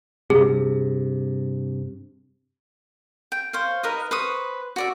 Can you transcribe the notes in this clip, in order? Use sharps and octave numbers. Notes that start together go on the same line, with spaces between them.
G2 C3 G#4
G5
C5 C#5 F5
D#4 A#4 B4 D#5
B4 C5 C#6 D#6
F#4 D5 E5